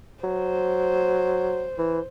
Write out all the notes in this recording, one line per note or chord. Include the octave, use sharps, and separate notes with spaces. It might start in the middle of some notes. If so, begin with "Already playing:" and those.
F#3 C5
E3